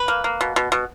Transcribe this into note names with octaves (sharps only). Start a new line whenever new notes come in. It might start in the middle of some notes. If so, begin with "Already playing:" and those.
Already playing: B4
A#3
A#3
B2
B2
B2